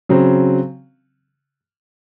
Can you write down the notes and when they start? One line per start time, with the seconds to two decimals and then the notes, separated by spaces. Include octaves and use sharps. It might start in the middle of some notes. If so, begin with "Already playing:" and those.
0.09 C#3 F#3 C4